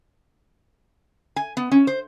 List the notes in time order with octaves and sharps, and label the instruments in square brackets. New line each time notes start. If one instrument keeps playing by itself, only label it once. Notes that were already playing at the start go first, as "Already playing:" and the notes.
[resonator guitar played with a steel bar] G#5
B3
C#4
C5